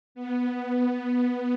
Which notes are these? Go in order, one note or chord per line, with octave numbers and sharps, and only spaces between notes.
B3